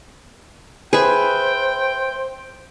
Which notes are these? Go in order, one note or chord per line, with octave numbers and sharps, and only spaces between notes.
G#4 B4 C5 E5 G5